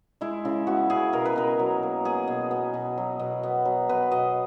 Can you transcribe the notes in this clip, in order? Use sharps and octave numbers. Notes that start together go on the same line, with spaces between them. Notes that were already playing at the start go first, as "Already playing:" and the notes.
G#3 E4
C#3 E4
B3 F#4
C#3 G#4
B2 A#4
B4
B2 A#4
F#3
A#3
B3 G#4
B2
B3
B2
F#3
B2
B3
F#3
B2 B4
B2 D#5